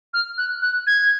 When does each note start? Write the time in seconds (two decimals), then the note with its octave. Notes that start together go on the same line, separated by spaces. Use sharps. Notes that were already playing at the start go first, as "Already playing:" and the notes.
0.14 F6
0.38 F#6
0.62 F#6
0.87 G#6